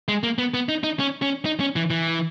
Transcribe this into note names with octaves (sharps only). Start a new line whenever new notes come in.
G#3
A#3
B3
B3
D#4
D#4
C#4
C#4
D#4
C#4
E3
E3